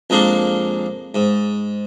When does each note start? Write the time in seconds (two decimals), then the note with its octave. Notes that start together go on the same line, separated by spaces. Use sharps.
0.10 F2 G#3 A#3 D4
1.15 G#2